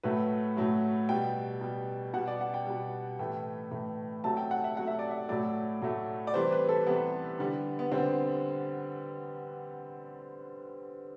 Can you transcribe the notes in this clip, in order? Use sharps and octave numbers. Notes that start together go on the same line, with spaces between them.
A2 F#3 A3 B4
A2 F#3 A3
B2 G3 G5
B2 G3
B2 G3 F#5
D5
F#5
G5
B2 G3
A2 E3 A3 G5
A2 E3 A3
C3 F#3 A3 A5
G5
F#5
E5
C3 F#3 A3 F#5
E5
D5
E5
A2 F#3 A3 D5
A2 F#3 A3
D5
C3 E3 G3 C5
B4
A4
C3 E3 G3 B3
D3 G3
B3
D3 G3 C4